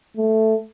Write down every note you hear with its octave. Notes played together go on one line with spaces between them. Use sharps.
A3